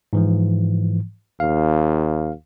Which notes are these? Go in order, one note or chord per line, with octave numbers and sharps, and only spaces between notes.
G#2 E3 F3
D#2 F5